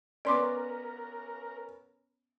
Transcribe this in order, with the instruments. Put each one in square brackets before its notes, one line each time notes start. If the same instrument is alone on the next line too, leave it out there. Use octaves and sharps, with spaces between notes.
[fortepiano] B3 C#4 [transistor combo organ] A#4 [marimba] D5 C6 D6